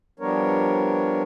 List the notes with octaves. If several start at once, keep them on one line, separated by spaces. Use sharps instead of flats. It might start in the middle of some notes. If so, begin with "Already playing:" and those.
F3 G3 B3 D4 A#4 C#5